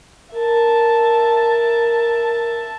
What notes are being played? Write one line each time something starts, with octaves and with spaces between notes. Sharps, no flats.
A#4 E5 A5